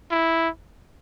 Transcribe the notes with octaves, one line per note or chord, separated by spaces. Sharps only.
E4